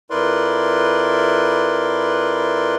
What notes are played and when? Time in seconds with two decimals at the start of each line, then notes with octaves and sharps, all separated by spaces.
0.10 F2 E4 A#4 B4 D5 C6